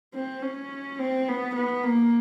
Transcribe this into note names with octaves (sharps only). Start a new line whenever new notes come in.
C4
C#4
C4
B3
B3
A#3